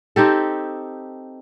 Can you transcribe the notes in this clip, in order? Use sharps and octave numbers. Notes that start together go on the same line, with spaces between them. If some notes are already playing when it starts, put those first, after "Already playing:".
C4 D#4 G4 A4